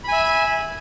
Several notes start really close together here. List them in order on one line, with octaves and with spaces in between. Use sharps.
B5 G#5 E5